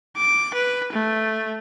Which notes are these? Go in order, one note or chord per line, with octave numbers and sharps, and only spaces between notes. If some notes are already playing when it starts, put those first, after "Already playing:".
D6
B4
A3